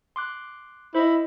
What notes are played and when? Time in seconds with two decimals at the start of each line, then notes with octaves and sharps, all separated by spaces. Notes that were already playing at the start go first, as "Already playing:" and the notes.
0.16 C6 D6 F#6
0.95 E4 C5 D#5